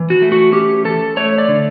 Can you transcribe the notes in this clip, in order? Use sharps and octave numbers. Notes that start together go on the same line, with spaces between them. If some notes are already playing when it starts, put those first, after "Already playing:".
Already playing: E3
F#4
A3
F#4
C#4 G4
E3 A4
A3 C#5
D5
D3